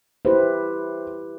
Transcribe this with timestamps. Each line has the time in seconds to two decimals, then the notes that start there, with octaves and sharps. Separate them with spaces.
0.25 E4 G4 B4 C5